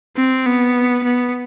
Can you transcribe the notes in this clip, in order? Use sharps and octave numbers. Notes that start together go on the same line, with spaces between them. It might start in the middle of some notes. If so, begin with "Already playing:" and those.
C4
B3
B3